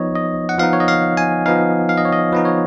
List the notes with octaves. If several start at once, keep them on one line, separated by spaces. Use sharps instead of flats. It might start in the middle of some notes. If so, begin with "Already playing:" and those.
Already playing: F3 B3 D#4 C#5 D#5
D#5
F#5
F3 B3 D#4 F5
C#5
D#5
F5
G#5
F3 B3 D#4 F5
F5
D#5
C#5
D#5
F3 B3 D#4 B4
C#5